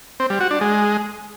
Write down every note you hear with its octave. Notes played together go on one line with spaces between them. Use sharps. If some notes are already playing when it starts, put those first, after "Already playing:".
C4
G3
F#4
D4
G#3